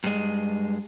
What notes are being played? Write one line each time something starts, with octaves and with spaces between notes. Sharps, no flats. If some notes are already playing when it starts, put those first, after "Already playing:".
G2 G#3